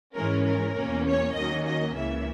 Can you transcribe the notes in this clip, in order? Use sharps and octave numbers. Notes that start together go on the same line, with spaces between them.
G#2 E3 G#3 C#4 A#4
A#4
E2 B2 A#3 C#4
C#5
D#2 D#3 F#3 A#3 C#4 D#5
D#5
C#2 C#3 E3 A#3 E5